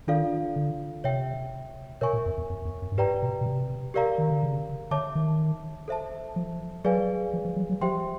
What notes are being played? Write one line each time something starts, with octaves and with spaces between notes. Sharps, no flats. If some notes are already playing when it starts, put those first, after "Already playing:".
D#3 D4 F4 A4 D5 F5
D3
C3 C#5 E5 G5
B2 A#4 C#5 E5 G#5 C#6
A#2
F2
E2
F2
E2
F2
G2
G#2 G4 B4 D5 G5 A#5
B2
B2
C3
G4 A#4 D5 F5 A#5
D#3
D3
C#3
D3 C#5 E5 A5 D6
D#3
A4 C5 E5 A5
F3
F#3 G#4 B4 D5 F5 G#5
F3
F3
F#3
F#3
F3 G4 C5 E5 G5 C6